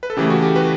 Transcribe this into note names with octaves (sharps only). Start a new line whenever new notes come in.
B4
A4
C#3 E3 A3 G4
F#4
G4
B4